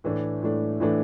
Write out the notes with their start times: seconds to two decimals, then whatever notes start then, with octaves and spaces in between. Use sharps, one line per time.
0.04 A2 E3 A3 D4
0.42 A2 E3 A3 D4
0.80 A2 E3 A3 D4